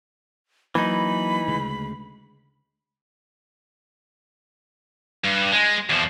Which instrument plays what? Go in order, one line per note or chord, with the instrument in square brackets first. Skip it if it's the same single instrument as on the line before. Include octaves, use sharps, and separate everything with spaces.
[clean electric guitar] E3 D#4 [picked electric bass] F#3 A#3 [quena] B5
[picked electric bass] D2 C#3 G#3
[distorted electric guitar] G2
G#3
E2 F3